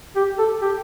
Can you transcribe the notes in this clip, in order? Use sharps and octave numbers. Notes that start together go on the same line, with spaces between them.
G4
A4
G4